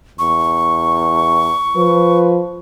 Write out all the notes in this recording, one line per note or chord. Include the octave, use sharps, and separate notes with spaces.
E2 C#6
F3 B4